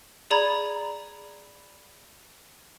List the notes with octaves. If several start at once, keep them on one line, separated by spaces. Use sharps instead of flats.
G#4 D5 A#5 B5 G#6